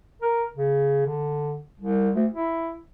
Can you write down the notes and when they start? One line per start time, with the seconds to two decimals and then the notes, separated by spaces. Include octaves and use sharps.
0.22 A#4
0.56 C#3
1.06 D3
1.79 C2
2.15 D2
2.31 E4